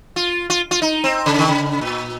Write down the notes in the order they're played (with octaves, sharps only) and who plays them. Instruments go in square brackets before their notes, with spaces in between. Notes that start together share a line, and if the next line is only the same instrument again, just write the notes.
[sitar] F4
F4
F4
D#4
C4
C#3
D#3
C#3
A#2